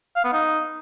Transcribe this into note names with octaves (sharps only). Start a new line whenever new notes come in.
F5
B3
D#4